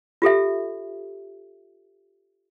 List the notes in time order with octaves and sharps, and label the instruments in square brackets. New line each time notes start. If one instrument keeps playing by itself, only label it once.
[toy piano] F4 G4 A4 E5